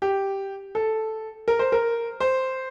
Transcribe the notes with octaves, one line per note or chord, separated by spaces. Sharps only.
G4
A4
A#4
C5
A#4
C5